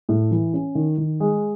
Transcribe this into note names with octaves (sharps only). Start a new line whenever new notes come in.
A2
E3
C#4
D#3
D#3
G#3